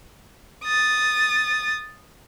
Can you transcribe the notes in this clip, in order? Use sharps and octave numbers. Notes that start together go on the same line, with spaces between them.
D#6 A6